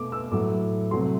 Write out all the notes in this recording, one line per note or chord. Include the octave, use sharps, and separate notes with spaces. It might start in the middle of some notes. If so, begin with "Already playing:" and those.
Already playing: B2 A3 D6
E6
A2 F#3 A3 D6
C3 F#3 A3 C6